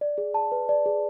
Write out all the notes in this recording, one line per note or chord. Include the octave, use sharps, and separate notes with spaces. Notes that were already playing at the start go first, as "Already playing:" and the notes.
D5
G#4
A5
B4
D5
G#4